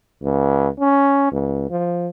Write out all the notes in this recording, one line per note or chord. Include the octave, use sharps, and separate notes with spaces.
C#2
C#4
C#2
F3